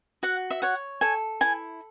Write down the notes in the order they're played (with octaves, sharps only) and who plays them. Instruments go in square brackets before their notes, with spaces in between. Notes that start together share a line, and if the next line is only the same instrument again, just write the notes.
[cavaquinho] F#4 F#5
E5
C#5 F#5
A4 G#5
E4 G#5